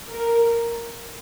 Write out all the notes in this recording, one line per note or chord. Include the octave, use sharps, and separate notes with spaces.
A#4